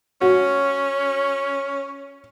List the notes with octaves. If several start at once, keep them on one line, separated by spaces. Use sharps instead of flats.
C#4 F#4